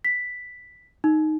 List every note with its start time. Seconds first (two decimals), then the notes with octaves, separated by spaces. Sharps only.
0.04 B6
1.04 D#4